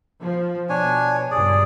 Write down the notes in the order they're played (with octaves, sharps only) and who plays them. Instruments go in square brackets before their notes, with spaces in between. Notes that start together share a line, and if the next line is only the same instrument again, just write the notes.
[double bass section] F3
[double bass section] B2 [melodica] D4 C#5 G#5
[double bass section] C#2 G2 [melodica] G#4 D5